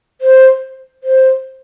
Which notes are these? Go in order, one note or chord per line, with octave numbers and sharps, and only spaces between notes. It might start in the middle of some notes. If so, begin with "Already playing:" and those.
C5
C5